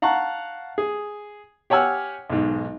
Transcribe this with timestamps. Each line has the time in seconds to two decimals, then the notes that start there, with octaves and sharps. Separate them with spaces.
0.02 F5 F#5 A5 A#5 C#6 F#6
0.78 G#4
1.70 G4 C#5 F#5 G#5 E6 F6
2.30 B1 G#2